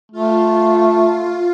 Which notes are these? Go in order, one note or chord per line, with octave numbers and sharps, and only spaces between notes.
A3 F4